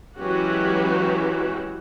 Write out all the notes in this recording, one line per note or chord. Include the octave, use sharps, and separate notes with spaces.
E3 F#3 G#3 C#4 F#4 G4